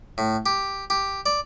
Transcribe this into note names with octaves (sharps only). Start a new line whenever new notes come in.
A2
G4
G4
D5